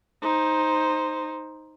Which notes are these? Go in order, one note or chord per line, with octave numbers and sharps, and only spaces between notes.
D#4 C5